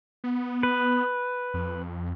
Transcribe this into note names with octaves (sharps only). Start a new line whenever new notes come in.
B3
B4
F2